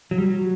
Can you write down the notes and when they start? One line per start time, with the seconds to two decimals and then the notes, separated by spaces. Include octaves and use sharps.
0.11 F#3
0.18 G3
0.26 F#3